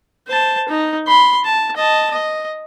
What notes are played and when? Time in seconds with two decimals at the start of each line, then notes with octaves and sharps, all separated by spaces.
0.28 C5 A5
0.69 D#4
1.07 B5 C6
1.45 A5
1.77 D#5 A5
2.11 D#5